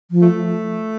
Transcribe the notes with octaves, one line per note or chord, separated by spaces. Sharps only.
F3
A3